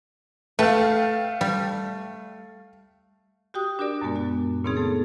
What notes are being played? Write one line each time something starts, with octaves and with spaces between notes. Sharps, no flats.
A3 B4 F5 G5
G3
F#4 G4 G5 D#6 F#6
D4 F#4 G4 A#4 D5
F#2 A#2 G#3 B3
F#4
A#2 C#3 B3 C4 D#4 G#4
A3 A4